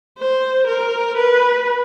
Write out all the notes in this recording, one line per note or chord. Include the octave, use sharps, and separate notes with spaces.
C5
A#4
B4